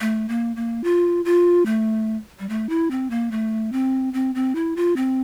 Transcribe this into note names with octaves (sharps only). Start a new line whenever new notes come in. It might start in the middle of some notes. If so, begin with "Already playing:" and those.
A3
A#3
A#3
F4
F4
A3
G3
A3
E4
C4
A#3
A3
C4
C4
C4
E4
F4
C4